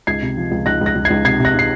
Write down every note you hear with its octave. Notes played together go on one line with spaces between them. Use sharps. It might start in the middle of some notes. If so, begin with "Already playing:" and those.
C#2 G#6 C7
C3
F3
C#2
C#2 F#6 A#6
C#2
F#6 A#6
C#2
G#6 C7
C#2
C3 G#6 C7
C3
F#6 A#6
C3 C7